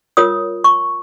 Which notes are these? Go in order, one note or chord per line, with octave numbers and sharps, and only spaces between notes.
F4 A#4 C#5 D#6
C#6